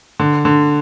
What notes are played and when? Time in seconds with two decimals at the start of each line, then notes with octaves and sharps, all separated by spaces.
0.20 D3
0.45 D3